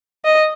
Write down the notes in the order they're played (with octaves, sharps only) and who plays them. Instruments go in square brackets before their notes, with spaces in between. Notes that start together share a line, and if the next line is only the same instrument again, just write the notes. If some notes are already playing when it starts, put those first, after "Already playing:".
[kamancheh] D#5